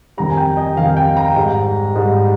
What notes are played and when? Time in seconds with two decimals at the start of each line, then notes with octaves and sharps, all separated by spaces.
0.17 F2 D#3 G3 A#5
0.30 G#5
0.37 G5
0.57 D#5
0.76 F2 D#3 G3 F5
0.97 G5
1.17 A#5
1.36 G#2 G3
1.96 G#2 G3